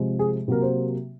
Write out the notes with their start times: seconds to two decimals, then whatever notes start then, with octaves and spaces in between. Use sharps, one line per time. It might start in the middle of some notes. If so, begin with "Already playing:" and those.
Already playing: C3 F3 G#3
0.19 G#4
0.48 C3 F#3 A#3 A#4
0.62 C5